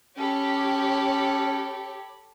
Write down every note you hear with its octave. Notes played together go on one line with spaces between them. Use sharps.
C#4 G4 A4 C#5 B5